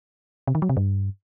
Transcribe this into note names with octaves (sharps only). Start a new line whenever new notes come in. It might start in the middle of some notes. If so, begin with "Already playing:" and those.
C3
D#3
F#3
C3
G2